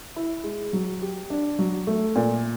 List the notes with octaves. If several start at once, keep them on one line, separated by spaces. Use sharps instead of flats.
E4
G#3
F#3
G4
D4
F#3
A3
A#2